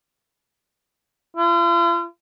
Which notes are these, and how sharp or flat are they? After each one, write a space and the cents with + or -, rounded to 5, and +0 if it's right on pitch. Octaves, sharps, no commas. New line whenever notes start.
F4 -45